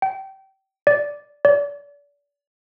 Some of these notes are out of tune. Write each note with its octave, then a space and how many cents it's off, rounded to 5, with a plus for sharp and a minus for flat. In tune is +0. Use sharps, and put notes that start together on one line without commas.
G5 -25
D5 -5
D5 -35